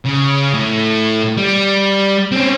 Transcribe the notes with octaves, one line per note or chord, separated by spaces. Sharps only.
C#3
A2
G3
C4 C#4